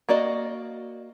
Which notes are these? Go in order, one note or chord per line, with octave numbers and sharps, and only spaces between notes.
A#3 F#4 D5 D#5